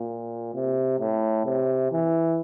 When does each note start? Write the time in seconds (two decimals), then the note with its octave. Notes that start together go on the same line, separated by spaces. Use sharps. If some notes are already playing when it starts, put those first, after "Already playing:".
Already playing: A#2
0.54 C3
0.99 A2
1.46 C3
1.91 E3